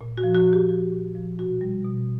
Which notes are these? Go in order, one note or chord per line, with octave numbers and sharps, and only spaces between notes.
A#2
F#4
F3
F#4
A#2
G4
F3 F#4
A#2
F3
B2 F#4
G3
B2